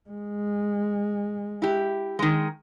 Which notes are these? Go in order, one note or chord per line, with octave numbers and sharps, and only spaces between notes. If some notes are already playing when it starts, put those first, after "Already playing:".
G#3
E4 G4
D#3 G#3